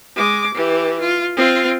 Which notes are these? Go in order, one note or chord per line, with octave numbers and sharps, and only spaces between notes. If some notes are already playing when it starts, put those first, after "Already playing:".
G#3 D6
E3 G4
F4
C4 F4